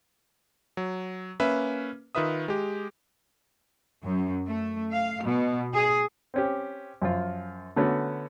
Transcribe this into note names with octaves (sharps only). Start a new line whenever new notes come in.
F#3
A#3 C#4 B4 E5
D#3 F4 B4 E5 D#6
G#3 G4
F#2
A3
F5
B2
G#4
C4 C#4 G4
F#2 F3 F4
D3 A3 B3 C#4 F#4